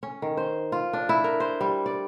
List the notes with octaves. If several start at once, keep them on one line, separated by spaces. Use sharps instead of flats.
C#4
D#3
C5
F4
D4
E4
A#4
C5
G3
D5